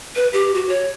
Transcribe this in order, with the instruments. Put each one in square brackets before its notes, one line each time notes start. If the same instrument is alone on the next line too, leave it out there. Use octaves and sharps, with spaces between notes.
[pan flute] B4
G4
F#4
C#5